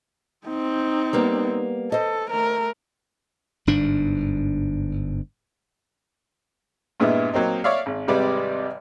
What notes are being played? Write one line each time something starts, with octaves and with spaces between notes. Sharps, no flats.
C4 D#4
G3 A#3 B3
A4 C5 D#5
A3 A#4
G1 G#2 D4
G2 A#2 G#3 B3 E4
F#3 A#3 C4 D#4
C#5 D5 E5 F5
G#1
G#1 C3 G3 G#3 B4 D5